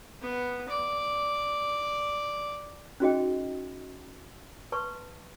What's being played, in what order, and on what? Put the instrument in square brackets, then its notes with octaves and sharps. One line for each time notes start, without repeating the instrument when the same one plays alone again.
[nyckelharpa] B3
D5
[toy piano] C#4 D#4 F#4 G#4 D#5 G5
B4 A5 C6 C#6